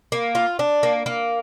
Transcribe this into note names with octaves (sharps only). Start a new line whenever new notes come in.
A#3
F4
D4
A#3
A#3